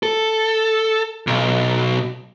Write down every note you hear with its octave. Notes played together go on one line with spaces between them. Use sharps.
A4
B1